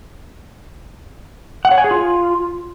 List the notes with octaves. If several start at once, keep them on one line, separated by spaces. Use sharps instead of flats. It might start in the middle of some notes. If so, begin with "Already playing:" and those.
F#5
C#5
G#5
G#4
F4